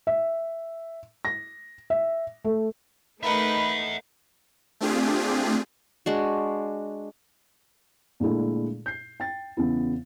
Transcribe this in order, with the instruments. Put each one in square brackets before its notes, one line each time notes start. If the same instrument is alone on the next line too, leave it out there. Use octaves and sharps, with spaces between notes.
[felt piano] E5
A#6
E5
A3
[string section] A3 D#4 [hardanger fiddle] A#4 B4 [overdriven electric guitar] E5 F#5 [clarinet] B5
[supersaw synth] A3 C4 D4 F4 G4 G#4
[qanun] G#3 D4 F#4
[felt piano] A#2 D3 G#3 A3 E4 G#4
G6 C7
G5 A6
E2 C#3 B3 E4